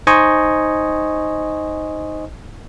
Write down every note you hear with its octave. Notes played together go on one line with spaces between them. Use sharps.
D#4 C5 D#5 G#5 C#6